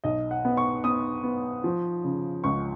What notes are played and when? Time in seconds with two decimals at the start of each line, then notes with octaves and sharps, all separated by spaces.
0.04 B1 D#5
0.31 F#5
0.45 B3
0.57 C#6
0.84 B3 D#6
1.23 B3
1.64 F3
2.04 C#3
2.44 C#2 C#6